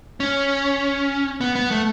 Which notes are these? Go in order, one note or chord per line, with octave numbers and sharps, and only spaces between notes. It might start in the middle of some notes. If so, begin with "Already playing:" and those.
C#4
B3
B3
A3